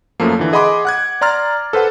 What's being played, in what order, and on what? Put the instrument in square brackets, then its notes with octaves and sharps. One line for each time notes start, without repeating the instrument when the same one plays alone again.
[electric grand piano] F#2 F3 A3 A#3
D3 E3
G#4 D#5 F#5 B5 C6 D6
F#5 F#6 G#6
D5 A#5 C6 F6 A6
A4 B4 C5 F#5